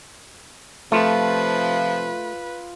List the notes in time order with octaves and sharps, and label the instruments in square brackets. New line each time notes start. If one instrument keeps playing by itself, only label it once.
[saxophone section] C3 F3 [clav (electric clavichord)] A3 [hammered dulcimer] F4 [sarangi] B4